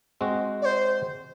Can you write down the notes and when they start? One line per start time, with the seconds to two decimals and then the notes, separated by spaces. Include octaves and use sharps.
0.21 G#3 C4 F#4
0.62 D5
0.65 C5